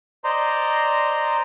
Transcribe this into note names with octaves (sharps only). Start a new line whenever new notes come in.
C5 D5 D#5 A#5 C6